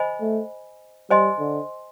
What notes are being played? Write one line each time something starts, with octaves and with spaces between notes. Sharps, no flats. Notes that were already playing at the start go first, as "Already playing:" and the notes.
Already playing: C5 D#5 G#5 B5
A3
G3 C5 D#5 G#5 C6
D3